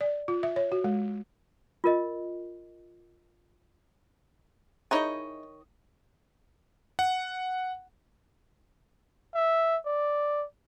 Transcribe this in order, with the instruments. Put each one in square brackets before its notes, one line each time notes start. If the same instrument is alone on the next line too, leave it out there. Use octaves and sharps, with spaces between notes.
[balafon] D5
F4
E5
C#5
F#4
G#3
[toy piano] F4 A#4 D#5
[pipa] D#3 C#5 D#5 [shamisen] D#4 E4 G#4
[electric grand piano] F#5
[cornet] E5
D5